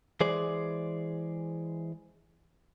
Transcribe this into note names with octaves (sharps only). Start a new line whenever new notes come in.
E3 G#3 G#4 C5 D5